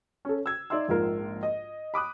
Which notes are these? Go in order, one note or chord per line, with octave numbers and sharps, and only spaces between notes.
C#4 A4
E6 G#6
D#4 D5 E5 C6 E6
A#1 G#2 F4 A#4
D#5
B5 D6 D#6 F#6